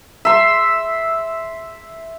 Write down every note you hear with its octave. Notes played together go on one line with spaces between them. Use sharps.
E5 C6